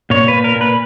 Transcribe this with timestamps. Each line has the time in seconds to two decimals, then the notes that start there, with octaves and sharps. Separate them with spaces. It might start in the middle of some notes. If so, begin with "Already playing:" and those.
0.10 A#2 C#5
0.28 B4
0.33 A#2
0.44 A#4
0.56 A#2
0.61 B4